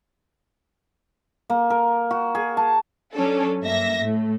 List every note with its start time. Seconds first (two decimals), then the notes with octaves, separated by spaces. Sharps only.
1.50 A#3
1.70 A#4
2.11 F#4
2.35 G#4
2.57 A5
3.14 F#3 C#4 D4 A4
3.62 G2 A#3 E5 A#6
4.00 A2 A3